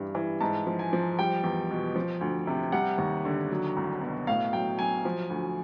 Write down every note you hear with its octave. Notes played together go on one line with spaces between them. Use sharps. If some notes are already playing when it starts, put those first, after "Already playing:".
Already playing: G2 E3 G3
E3
G#2 A5
F3
G#5
F3
G3 G5
E2
B2
F3
D2
C3
G3 F#5
D#2
D3
F#3
C2
B2
A2 F5
F#3 G5
F#3 G#5
F3
D2